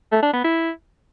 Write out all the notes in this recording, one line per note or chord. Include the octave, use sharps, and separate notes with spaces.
A3
D4
B3
E4